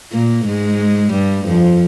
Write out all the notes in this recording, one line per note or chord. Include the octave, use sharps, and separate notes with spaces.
A#2 A#3
G#2 G#3
G2 G3
F2 F3